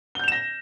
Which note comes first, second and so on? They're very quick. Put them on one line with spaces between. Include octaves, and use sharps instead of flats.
G7 G6 F7 E7 A#6